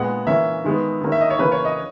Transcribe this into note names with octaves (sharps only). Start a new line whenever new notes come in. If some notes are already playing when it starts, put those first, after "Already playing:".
Already playing: A#2 G#3 B3 F#5
E3 A#3 C#4 E5
D#3 G#3 B3
D#3 A#3 C#4
E5
D#5
C#5
C#3 E3 A#3 C#4 B4
C#5
D#5